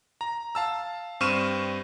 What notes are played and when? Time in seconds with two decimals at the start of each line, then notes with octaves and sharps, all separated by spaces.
0.21 A#5
0.55 F5 A5 E6
1.21 G2 C4 C#6 F6 D#7 E7